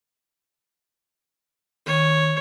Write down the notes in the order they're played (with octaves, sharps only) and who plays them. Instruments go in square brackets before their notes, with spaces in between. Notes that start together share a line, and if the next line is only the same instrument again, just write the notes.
[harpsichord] D#3 [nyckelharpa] C#5